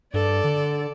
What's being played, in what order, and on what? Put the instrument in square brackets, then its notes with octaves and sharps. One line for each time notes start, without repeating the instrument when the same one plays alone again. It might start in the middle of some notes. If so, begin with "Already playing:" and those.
[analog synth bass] G2 [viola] A4 D5
[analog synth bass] D3